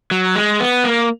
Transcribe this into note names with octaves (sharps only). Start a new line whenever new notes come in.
F#3
G#3
B3
A#3